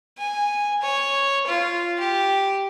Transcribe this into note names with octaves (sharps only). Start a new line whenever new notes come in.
G#5
C#5
F4
G4